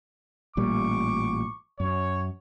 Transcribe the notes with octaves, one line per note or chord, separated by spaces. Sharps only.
A1 A#2 G3 C#6 D6
F#2 C#5